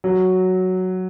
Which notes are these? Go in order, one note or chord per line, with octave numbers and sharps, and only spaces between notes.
F#3